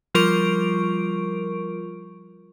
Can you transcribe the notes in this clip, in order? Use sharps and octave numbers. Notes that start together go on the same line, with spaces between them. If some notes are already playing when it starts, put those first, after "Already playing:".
F3 G3 F4 A#4 C#6 D7